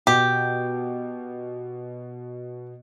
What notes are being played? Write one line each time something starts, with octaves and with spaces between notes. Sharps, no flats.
B2 G4